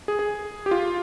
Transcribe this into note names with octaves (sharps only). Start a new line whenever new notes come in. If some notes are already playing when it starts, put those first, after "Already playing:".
G#4
G#4
G4
F4